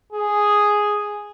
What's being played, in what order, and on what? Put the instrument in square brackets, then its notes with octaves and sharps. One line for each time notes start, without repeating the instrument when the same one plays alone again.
[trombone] G#4